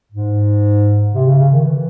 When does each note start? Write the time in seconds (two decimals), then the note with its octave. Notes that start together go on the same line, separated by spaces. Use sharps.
0.12 G#2
1.14 C3
1.26 C#3
1.39 C#3
1.52 D#3
1.65 E3